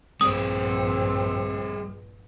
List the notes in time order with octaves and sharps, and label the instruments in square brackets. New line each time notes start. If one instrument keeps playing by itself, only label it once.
[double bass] A#1 G2 [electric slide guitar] G3 G#4 D5 [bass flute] C4 [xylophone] D#6